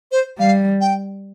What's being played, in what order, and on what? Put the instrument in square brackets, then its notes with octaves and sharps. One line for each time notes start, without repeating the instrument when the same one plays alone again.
[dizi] C5
[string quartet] G3 [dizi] F5
[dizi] G5